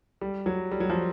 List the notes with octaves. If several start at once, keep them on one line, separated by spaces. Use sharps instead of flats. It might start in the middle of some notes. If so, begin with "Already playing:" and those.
G3
F#3
G3
F#3
F3